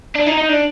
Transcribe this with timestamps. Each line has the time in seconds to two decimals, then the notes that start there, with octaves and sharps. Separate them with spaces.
0.15 D4
0.26 D#4
0.37 D#4
0.49 D4